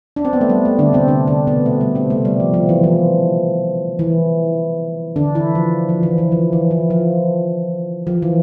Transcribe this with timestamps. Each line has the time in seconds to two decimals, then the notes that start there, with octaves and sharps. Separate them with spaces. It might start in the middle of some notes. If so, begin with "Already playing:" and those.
0.16 D4
0.25 C4
0.33 B3
0.41 A3
0.49 G3
0.65 A3
0.79 D3 D4
0.93 C3 C4
1.08 D3 D4
1.27 D3 D4
1.47 B2 B3
1.66 A3
1.81 G3
1.95 C3 C4
2.10 A3
2.25 G3
2.40 F3
2.54 F3
2.69 E3
2.84 F3
3.99 E3
5.16 D3 D4
5.35 E3 E4
5.55 F3
5.89 F3
6.03 E3
6.18 E3
6.32 F3
6.53 E3
6.71 F3
6.90 F3
8.07 F3
8.22 E3